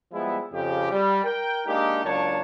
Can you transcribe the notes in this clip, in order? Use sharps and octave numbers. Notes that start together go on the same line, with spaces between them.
F3 G3 G#3 B3 E4
F2 C#3 G4
G3
A#4 G5
G#3 A#3 D4 D#4 G4
C#2 F#3 A#3 D4 C#5 A5